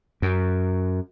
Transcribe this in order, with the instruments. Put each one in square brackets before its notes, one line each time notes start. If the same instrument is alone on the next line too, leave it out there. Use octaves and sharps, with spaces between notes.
[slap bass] F#2